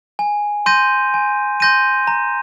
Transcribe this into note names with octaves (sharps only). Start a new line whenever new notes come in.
G#5
C6 G6 A#6 D#7
G#5
C6 G6 A#6 D#7
A#5